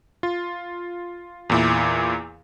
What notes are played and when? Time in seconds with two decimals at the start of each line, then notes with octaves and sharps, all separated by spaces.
0.23 F4
1.50 E2 A#2 E4